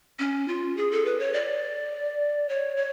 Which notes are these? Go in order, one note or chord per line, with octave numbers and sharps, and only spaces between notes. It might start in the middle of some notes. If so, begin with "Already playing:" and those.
C#4
F4
G#4
A4
B4
C#5
D5
C#5
C#5